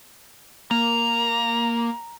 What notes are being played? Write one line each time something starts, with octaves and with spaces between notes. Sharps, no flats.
A#3 A#5